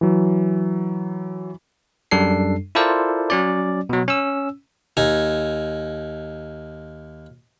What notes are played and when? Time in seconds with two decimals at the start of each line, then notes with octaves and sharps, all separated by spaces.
0.01 E3 F#3
2.11 F#2 G3 D4 A4 C7
2.75 E4 F4 A4 A#4 C5 D5
3.30 F#3 C#4 D5
3.89 B2 F#3
4.08 C#4 E6
4.97 D#2 D#4 G#5